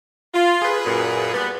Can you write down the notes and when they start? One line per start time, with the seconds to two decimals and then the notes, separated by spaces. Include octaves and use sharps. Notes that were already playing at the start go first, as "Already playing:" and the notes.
0.34 F4
0.62 G#4 B4
0.86 F#2 A#2
1.33 G3 B3